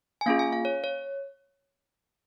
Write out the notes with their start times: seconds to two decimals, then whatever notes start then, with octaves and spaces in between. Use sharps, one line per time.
0.21 G#5
0.26 A#3 C#4 F4 G#4 F5
0.39 G#5
0.53 F5
0.65 C#5
0.84 C#5